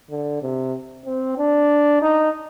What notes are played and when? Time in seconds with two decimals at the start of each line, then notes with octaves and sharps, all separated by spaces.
0.11 D3
0.42 C3
1.06 C4
1.38 D4
2.02 D#4